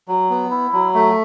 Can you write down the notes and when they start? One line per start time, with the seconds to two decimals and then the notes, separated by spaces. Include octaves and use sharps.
0.08 F#3
0.30 B3
0.51 E4
0.73 F#3
0.94 A3